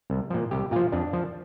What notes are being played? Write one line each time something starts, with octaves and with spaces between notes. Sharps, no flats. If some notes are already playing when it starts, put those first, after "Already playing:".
C2
A#2 F3
C2 G4
A#2 F3 F4
F2 D4
F3